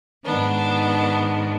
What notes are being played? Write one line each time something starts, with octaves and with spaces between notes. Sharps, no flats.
G#2 D#3 B3 D4